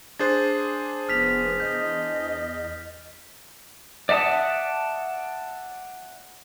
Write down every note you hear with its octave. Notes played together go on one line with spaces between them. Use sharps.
D4 G#4 C5 A6
F1 B3 F6 B6 F7
E2 D#5 G6
D5 E5 F#5 A5 D#6